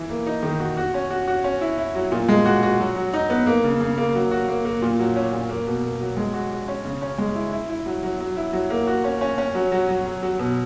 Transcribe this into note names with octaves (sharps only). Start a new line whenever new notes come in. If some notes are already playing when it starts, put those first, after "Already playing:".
Already playing: E3
A#3
D#4
D#3
F#4
F#4
C#4
F#4
F#4
C#4
E4
E4
F#3
A#2
G#3
F#4
F#4
F#3
F#3
D#4
B3
A#3
C#3
C#3
A#3
F#3
F#4
A#3
A#3
A#2
F#3
C#4
A#2
A#3
B2
A#3
F#3
G#3
F#4
F#4
C#4
C#3
C#4
G#3
E4
E4
E4
F#3
F#3
F#3
E4
F#3
A#3
F#4
C#4
C#4
C#4
F#3
F#3
F#3
F#3
F#3
B2